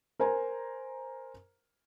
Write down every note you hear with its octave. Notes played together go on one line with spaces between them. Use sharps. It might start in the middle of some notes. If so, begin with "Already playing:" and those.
A#4 C5 G#5 A#5